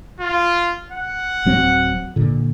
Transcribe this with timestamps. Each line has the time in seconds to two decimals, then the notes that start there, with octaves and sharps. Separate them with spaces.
0.20 F4
0.92 F#5
1.45 D1 F#3 C4
2.16 A#2 D3